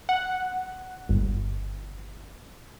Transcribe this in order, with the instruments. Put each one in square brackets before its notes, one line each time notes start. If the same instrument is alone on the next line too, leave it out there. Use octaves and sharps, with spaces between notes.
[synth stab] F#5
G1